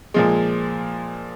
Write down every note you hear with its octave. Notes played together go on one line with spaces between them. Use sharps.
A#2 F3 G#3